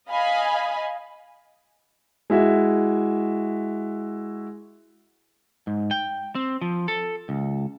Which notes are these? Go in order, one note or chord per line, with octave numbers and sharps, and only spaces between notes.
D#5 F5 G#5 B5
G#3 E4 F#4 E5
G#2
G5
C4
F3
A4
C#2